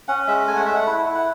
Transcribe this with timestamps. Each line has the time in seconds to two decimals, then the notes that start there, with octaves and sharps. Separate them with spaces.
0.08 C#4 F#5
0.28 G#3 E5
0.47 A3 G#5
0.56 F#5
0.66 A3 E5
0.75 F#5
0.87 E4
1.06 E4
1.15 F#5